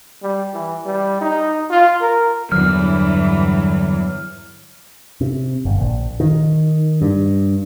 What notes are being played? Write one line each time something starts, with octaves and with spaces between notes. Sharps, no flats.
G3
E3
G3
D#4
F4
A#4
E2 G2 D3 E3 F#3 F6
C3
G1
A#1
D#3
G2